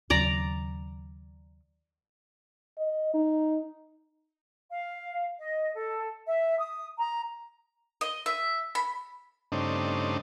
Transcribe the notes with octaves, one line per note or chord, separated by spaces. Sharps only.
D#2 C#3 F#3 D5 A#5
D#5
D#4
F5
D#5
A4
E5
D#6
A#5
D#5
E5
B5
G2 C#3 A3 C4 D4 D#4